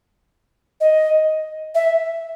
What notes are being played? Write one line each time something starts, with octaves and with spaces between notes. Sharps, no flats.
D#5
E5